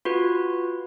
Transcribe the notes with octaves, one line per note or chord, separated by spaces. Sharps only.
F4 F#4 B4